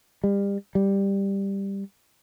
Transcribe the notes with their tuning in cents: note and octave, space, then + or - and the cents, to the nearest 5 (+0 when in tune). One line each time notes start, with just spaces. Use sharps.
G3 +30
G3 +10